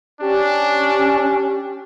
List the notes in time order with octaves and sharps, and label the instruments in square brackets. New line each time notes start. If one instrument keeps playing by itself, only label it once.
[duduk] C#4 [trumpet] D4 [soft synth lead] G4